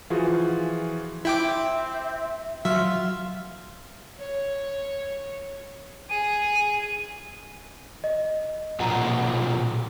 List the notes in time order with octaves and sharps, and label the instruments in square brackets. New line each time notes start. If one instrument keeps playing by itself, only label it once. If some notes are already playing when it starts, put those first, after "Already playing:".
[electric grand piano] E3 F3 F4 F#4 G#4
[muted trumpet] C4 [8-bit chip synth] E4 G5 D6 [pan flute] E5
[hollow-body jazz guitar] F#3 [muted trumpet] F4 [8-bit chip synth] E5 [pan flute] F6
[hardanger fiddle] C#5
[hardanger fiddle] G#4 [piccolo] D#7
[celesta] D#5
[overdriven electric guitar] B1 A#2 [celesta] F#5 A#5